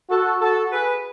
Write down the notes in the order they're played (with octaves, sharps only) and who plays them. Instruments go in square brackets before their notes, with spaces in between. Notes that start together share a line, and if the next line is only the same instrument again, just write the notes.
[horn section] F#4 A4
F#4 A4
G#4 B4